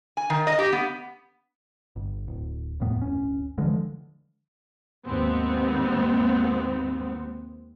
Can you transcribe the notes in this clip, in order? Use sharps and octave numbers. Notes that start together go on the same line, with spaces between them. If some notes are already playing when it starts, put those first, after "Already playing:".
G#5
D#3
D#5
G4
B3
G1
D1
D#1 F2 A2 B3
D1 G1 C#4
D3 E3 F3 G#3
D#2 G#2 B3 C4